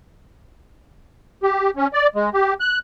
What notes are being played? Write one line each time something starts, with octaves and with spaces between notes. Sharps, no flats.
G4
C#4
D5
G#3
G4
F#6